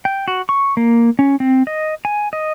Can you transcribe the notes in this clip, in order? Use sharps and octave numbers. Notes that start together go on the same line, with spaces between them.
G5
F#4
C#6
A#3
C#4
C4
D#5
G#5
D#5